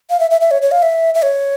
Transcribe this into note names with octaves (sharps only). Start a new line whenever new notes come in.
F5
E5
E5
E5
C#5
C#5
F5
E5
E5
C#5